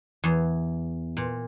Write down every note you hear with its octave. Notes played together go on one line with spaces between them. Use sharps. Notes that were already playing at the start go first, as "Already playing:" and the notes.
E2
A#2